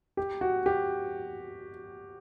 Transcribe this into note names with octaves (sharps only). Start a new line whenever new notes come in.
G4
F#4
G4